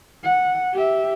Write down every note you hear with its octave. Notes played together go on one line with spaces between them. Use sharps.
F#5
G4 E5